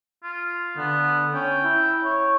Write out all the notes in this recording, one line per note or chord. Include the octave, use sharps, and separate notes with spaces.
F4
D3 B3
C#4 G5
E4
C#5